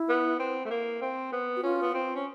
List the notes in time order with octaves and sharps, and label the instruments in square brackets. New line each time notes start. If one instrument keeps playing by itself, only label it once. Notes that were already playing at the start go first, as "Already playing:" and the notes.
Already playing: [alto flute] E4
[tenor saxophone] B3
C4
A3
A#3
C4
B3
[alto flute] F#4
[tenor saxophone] C#4 [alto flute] F4
[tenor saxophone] B3
C4
C#4